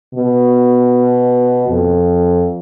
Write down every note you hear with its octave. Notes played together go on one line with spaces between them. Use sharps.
B2
F2